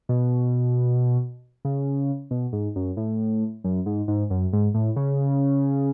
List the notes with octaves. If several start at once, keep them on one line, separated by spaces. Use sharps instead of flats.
B2
C#3
B2
G#2
F#2
A2
F#2
G#2
G#2
F#2
G#2
A2
C#3